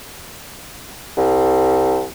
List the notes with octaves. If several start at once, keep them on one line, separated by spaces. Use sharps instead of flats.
C2